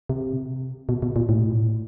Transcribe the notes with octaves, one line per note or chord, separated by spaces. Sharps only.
C3
B2
B2
A#2
A2